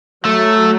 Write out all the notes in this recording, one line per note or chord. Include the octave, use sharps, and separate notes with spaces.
F#3 A3